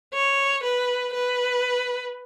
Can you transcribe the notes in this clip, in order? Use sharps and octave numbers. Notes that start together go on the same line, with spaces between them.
C#5
B4
B4